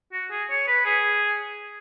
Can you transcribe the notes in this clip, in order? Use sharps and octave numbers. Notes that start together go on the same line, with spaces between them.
F#4
G#4
C#5
B4
G#4